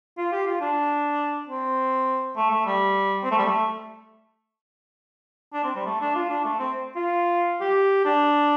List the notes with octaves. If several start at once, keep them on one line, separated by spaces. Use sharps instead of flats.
F4
G4
F4
D4
C4
A3
A3
G3
C4
A3
G3
A3
D4
C4
G3
A3
D4
F4
D4
A3
C4
F4
G4
D4